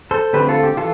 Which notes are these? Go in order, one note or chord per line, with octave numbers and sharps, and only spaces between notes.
A4 C5
D3 A3 C4 G4 B4
F4 A4
G4
E3 F4 A4